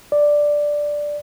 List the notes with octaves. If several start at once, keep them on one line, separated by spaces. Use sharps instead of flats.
D5